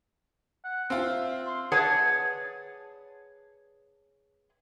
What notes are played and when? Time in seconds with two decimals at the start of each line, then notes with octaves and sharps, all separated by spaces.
0.64 F#5
0.90 C4 F4 E5
1.47 C6
1.72 G#4 B4 C#5 D5 F#5 A5